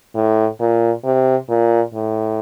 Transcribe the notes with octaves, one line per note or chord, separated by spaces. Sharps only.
A2
A#2
C3
A#2
A2